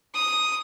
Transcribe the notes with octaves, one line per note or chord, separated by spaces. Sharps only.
D#6